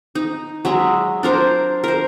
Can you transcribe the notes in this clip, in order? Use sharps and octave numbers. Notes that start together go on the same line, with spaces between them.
D#4
F#3 G#3 E5
D4 A#4 C5
A#4 C5